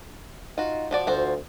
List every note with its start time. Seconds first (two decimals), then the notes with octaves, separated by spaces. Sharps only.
0.58 D#4 F4 F#4
0.91 F3 F#4 D5
1.07 D2 F4 F#4 C5